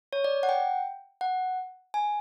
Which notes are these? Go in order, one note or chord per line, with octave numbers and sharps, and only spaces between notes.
C#5
D5
F#5
G5
F#5
G#5